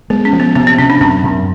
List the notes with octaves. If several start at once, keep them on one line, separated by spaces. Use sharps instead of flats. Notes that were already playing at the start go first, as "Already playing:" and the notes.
G#3 B3
C#4
F3
B3
C3 B3
C4
C3 C#4
D4
F#2 C4
F#2